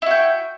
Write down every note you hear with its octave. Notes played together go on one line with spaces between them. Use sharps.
E4 F#4 G5